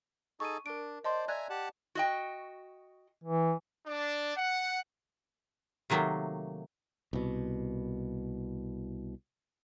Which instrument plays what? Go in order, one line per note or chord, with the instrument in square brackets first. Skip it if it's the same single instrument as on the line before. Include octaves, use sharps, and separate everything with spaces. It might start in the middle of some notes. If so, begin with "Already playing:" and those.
[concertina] D#4 G#4 A4 [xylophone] C#6 D#7
[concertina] D4 [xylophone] A#4 D7
[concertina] C5 D5 [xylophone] D#5 A5 C6
[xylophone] D5 F#6 G#6 [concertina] E5 G#5 A#5
[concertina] G4 F#5 A5
[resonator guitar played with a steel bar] F#4 D#5 G5
[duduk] E3
[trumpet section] D4
F#5
[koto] C3 D#3 F#3 A3 A#3
[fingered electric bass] C2 B2